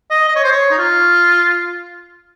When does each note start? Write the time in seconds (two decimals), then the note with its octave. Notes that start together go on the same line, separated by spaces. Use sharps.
0.11 D#5
0.28 D#5
0.36 C#5
0.44 C5
0.52 C#5
0.71 D#4
0.78 F4